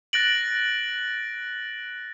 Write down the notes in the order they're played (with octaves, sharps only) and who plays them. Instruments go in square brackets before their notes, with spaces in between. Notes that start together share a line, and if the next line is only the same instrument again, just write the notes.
[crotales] F#6 A6 A#6 D7 F#7